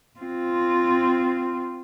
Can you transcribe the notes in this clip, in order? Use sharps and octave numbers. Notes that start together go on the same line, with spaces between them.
C4 F4